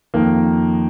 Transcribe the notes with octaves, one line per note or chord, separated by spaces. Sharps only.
F2 D#3 A#3